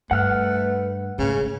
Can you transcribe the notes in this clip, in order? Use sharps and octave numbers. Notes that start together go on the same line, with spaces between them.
G2 A3 B4 F#5 F6 F#6
G#2 C#3 A3